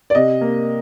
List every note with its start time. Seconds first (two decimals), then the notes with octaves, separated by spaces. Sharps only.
0.10 D5
0.15 C3 D#5
0.41 A#3